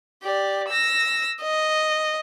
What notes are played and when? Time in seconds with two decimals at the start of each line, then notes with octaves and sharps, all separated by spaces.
0.23 G4 D5
0.68 E6 A#6
1.42 D#5